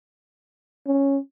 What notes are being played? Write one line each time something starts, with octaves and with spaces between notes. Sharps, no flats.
C#4